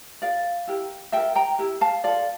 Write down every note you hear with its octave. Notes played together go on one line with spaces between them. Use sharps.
F4 A#4 D5 F5
E4 G4 A#4
F4 A#4 E5 G5
G5 A#5
E4 G4 A#4
F5 A5
F4 A4 D5 F5